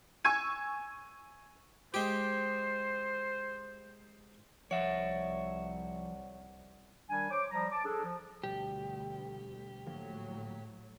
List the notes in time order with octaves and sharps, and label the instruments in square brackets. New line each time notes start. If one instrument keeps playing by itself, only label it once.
[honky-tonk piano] G#5 C#6 E6 G#6 D#7
[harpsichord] G#3 G4 [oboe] C5
[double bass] C2 [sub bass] F3 [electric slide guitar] C#5 E5 [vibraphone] F#5
[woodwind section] D#3 G3 D4 G#5
C5 C#5 D6
F3 G3 A#5
A5 D6
D4 G#4 A4
F3
[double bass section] D2 [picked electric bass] B2 F3 G3 [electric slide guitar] G4
[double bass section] A2 F#3 [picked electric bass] D3 F3 A#3